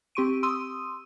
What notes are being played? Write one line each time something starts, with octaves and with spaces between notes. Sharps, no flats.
C4 G4 C6 C#6 D7 D#7
C6 D#6 E6 D#7